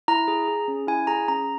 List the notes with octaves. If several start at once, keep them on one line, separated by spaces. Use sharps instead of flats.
E4 A#5
G#4
G#4
C#4
E4 G#5
G#4 A#5
C#4 A#5